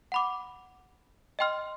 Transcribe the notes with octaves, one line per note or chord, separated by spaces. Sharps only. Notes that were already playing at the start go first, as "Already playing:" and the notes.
F#5 B5 D6
D#5 G5 C6 F6